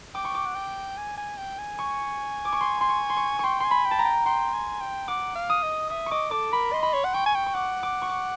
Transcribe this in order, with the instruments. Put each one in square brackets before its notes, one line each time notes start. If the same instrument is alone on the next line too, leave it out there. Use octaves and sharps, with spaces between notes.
[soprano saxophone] G5 [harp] D6
[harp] C#6
D6
[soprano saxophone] F#5
G5
G#5
G#5
G5
G#5
[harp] C#6
D6
C#6
C6
C6
C#6
C6
C#6
[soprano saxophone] G5 [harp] C6 C#6
[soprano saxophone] G#5 [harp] C6
[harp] B5
[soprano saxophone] G5
[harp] A5
A#5
[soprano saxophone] G5
[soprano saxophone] G5 [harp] C6
[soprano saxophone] G#5
G5
[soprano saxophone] F#5 [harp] D6
[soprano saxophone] F5
[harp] D#6
[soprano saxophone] D#5
[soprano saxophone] E5 [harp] D#6
[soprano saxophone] D#5 [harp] C#6 D6
[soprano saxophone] A4 [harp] D6
[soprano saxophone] A#4 [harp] B5
[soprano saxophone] D#5 [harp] C6
[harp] B5
[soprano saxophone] C#5 [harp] C6
[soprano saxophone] F#5
[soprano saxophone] G5 [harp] C#6
[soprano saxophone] G#5
G5
[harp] C#6
[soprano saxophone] F#5 [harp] D6
[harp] D6
C#6
D6